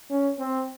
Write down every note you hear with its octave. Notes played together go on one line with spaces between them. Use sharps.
C#4
C4